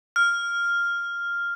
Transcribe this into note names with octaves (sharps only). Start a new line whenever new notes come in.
F6